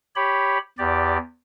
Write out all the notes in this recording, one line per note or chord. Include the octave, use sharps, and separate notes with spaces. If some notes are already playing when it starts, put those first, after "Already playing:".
G4 C#5 B5
E2 G4 D5